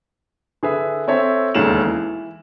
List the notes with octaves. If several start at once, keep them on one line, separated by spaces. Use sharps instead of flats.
D3 G#4 B4 E5
C4 A4 C#5 E5
E1 D#2 C#3 A3 E7 F#7
E3